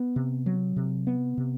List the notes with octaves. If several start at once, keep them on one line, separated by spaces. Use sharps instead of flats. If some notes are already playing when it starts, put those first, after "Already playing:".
Already playing: B3
C3
F#3
C3
B3
C3